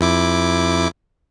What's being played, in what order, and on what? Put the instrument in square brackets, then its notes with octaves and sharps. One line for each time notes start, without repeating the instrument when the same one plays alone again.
[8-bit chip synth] F2 E4 D6